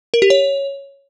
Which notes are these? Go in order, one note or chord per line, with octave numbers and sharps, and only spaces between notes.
A#4
G4
C#5